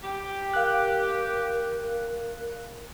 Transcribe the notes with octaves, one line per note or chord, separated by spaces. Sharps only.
G4
A#4 F5 F#6